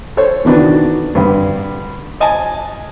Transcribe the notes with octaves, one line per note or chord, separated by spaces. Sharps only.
A4 C5 C#5
B2 D#3 E3 D4 F#4 B4
G2 D3
D#5 G#5 A5